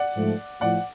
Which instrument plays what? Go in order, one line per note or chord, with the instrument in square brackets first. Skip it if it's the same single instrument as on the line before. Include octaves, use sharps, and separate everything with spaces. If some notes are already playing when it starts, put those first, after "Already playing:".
Already playing: [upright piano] D5 F#5
[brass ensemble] G#2 F3 A3
[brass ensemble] A2 F3 [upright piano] D5 F#5